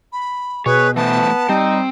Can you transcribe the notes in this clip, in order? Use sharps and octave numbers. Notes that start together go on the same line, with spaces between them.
B5
B2 G#4 B4 C#5
E3 A3 B3 C5 A5
G3 C4 D#4